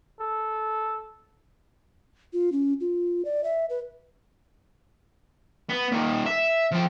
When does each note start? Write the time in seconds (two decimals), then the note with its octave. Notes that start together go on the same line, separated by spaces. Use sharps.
0.20 A4
2.33 F4
2.52 C#4
2.81 F4
3.25 D5
3.44 E5
3.70 B4
5.70 B3
5.92 A#2 D#3
6.26 E5
6.72 F3 G5